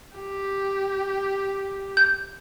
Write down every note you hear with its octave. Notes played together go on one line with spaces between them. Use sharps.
G4
G6